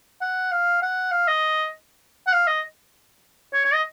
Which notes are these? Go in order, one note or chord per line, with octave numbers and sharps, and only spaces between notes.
F#5
F5
F#5
F5
D#5
F#5
F5
D#5
C#5
C#5
D#5